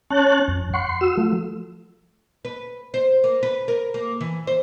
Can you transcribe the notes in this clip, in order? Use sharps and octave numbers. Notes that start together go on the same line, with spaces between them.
C#4 C#5 A5 F#6
F2
F#5 C6 C#6
C6
F#4 E6
F3 A3
B4
C5
A#3
B4
A#4
A#3
E3
C5